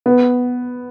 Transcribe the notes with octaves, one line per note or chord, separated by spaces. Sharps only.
B3